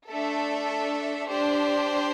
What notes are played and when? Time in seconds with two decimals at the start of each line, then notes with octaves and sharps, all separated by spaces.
0.10 A3 D4 A4 E5
1.29 D4 G4 C5